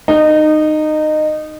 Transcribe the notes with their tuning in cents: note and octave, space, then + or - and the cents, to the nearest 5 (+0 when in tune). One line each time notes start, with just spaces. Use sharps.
D#4 -20